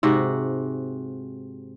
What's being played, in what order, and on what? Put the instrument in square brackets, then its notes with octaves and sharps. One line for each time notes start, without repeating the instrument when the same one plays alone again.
[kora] G#2 C3 F#4